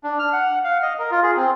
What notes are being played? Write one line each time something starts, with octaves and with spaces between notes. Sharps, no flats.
D4
F6
F#5
F5
D#5
A#4
F4
G#4
C4